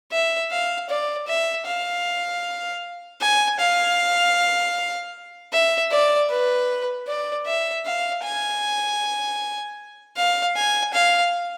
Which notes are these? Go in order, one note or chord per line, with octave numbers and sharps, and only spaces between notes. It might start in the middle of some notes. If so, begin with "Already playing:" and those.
E5
F5
D5
E5
F5
G#5
F5
E5
D5
B4
D5
E5
F5
G#5
F5
G#5
F5